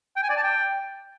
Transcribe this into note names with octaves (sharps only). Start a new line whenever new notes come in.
G5
G#5
D5
A5
G5